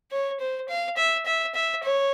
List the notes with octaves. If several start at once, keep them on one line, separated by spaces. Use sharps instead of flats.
C#5
C5
F5
E5
E5
E5
C#5